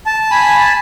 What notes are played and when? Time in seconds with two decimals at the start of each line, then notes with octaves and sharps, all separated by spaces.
0.06 A5
0.31 G#5 B5